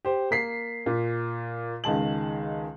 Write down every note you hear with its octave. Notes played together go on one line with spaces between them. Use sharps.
G4 C5
A#3 B6 C7
A#2
C#2 D#3 G#3 A5 F#7